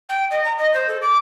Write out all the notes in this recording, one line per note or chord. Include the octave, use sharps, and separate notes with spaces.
G5
D#5
A#5
D#5
C5
A4
D6